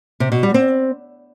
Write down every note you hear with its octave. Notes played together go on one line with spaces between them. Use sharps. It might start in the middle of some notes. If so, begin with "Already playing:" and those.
C3
B2
G3
C4